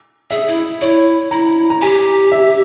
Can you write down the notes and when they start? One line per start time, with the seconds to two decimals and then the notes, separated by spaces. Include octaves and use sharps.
0.31 G#4 E5
0.48 E4
0.81 E4 C#5
1.31 E4 A#5
1.70 A#5
1.81 G4 G#5
2.32 E5